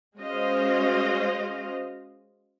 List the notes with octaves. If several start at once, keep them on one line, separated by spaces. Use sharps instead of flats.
G#3 C#4 F#4 C5 D#5 F5